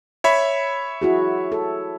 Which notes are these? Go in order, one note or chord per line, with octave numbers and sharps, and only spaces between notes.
C#5 E5 B5
E4 F#4 G#4
A4